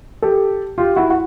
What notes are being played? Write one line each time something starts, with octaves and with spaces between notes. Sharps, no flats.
G4 A4
F4 G4
E4 F#4
F#4